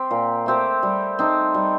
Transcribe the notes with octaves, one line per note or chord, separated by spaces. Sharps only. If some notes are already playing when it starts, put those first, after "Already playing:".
Already playing: C4 G4
A#2
A3 C4 G4
G3
C4 D#4 A4
G3